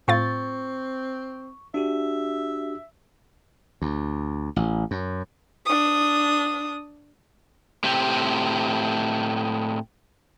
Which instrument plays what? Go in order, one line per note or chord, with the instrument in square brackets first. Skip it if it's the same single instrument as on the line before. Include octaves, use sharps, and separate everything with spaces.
[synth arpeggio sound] A2 F4 A6 [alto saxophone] C4 [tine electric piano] C#6
[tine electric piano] D4 F#4 G4 [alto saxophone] E5
[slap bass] D2
A1
F#2
[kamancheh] D4 D#6
[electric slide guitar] A2 C4 G4